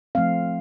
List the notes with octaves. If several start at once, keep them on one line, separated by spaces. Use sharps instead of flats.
F3 A3 C4 F5